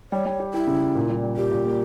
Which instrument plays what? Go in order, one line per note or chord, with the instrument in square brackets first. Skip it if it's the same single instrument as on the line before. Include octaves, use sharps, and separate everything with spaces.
[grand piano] G3 [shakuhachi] C#5
[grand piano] G3
G4
[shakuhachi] E4 [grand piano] G4
[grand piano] C#3
C#3
A#2
G3
G3
[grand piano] A#2 [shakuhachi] G4
[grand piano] A#2
A#3